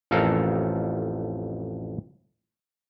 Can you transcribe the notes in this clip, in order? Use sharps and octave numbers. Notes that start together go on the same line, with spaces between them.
A1 F2 A4 A#4 F5